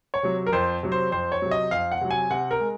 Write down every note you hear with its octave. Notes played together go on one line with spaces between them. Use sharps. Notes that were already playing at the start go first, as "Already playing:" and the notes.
C#5
C3 F#3
A#4
F2 C5
C3 F#3
C5
F2 C5
C#5
C3 F#3
D#5
F2 F5
F#5
C3 F#3
G#5
C3 F#5
A#4
G#3